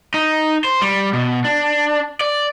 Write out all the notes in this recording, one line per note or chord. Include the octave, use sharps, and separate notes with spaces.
D#4
C5
G3
B2
D4
D5